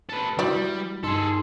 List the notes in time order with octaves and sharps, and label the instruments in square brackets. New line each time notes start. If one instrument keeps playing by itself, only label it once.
[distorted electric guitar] A4 B4
[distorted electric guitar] G3 [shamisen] E4 D5 [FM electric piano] F#4
[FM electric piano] G2 D#4 C6 [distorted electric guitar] G#4 A4